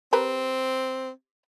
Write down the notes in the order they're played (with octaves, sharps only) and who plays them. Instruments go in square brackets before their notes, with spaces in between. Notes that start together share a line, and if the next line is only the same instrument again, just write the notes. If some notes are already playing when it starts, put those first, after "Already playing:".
[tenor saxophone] C4 [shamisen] G4 A#4 B4